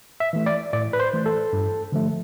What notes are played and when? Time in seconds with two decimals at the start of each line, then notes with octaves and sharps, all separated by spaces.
0.20 E5
0.33 E3 A3
0.46 D5
0.73 A2 D5
0.93 B4
1.00 C5
1.14 E3 A3
1.26 A4
1.53 G2
1.92 D3 F3 A3